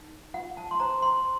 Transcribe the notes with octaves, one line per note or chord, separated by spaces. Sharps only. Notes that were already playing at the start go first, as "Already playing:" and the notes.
Already playing: D#4
F4 F#5
A5
C6
C5 A#5
C6